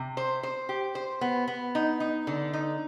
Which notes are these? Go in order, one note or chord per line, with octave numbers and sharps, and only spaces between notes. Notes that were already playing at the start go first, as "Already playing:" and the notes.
Already playing: C3
C5
C5
G4
C5
B3
B3
D#4
D#4
D3
D#4